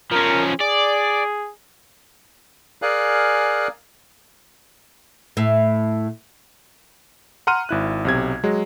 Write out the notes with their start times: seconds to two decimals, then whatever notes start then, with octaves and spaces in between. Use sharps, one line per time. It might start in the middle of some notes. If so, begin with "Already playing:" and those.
0.11 F3 C#4 A#4
0.60 G#4 D5
2.82 G#4 A#4 D5 F5 G#5 F#6
5.37 A2 E5
7.47 F#5 A#5 C6 F6 D#7
7.69 G#1 E4 F#6
8.05 B1 C3 G#6
8.43 F#3 G#3